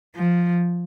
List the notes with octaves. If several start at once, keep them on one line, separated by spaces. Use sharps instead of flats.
F3